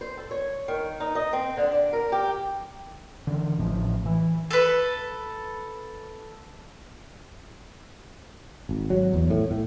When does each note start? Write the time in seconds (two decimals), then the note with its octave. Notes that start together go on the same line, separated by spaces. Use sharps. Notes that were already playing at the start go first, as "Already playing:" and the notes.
0.01 C5
0.17 A4
0.31 C#5
0.68 D#3
1.00 D#4
1.15 D#5
1.33 C4
1.57 D3
1.72 D4
1.93 A#4
2.12 G4
3.27 D3 E3
3.58 A1 A2 F3
4.06 E3
4.51 A4 B4
8.69 G#1
8.90 F#3
9.14 E2
9.30 A2
9.51 A2